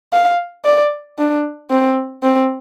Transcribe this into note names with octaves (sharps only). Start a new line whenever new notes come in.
F5
D5
D4
C4
C4